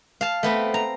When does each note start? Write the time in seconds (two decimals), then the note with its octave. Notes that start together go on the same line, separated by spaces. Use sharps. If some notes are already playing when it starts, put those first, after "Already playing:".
0.21 F5 A5
0.43 A3 B3 C4
0.74 A#5